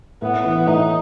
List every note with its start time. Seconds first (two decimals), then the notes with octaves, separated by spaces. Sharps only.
0.22 A2 B3
0.45 E3
0.67 A2 D#4